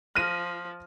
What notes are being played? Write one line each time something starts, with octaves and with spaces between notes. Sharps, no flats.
F3 F6 A#6 D#7